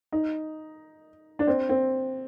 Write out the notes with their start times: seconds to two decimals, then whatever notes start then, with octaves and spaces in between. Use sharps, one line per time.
0.12 D#4
1.39 D4
1.47 C4
1.69 C4